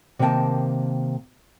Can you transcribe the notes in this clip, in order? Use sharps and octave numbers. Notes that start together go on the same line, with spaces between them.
C3 D#3 A#3 E5 G5 A5